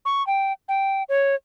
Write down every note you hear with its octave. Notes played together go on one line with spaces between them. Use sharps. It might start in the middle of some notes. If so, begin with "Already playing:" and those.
C#6
G5
G5
C#5